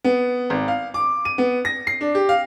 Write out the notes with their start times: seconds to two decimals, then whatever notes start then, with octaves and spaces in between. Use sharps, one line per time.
0.04 B3
0.50 G#1
0.68 F5
0.94 D6
1.25 D#7
1.38 B3
1.65 A#6
1.87 C7
2.01 D4
2.15 G4
2.29 F5